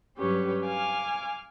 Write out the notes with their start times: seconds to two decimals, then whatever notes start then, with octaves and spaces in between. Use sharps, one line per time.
0.18 G2 F#3 C#4 G4 B4 C#5
0.65 F5 G#5 D6 F6